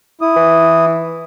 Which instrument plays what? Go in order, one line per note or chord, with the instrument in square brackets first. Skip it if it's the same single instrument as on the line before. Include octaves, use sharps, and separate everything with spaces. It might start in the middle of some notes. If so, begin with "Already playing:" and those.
[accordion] E4 D#6
[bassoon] E3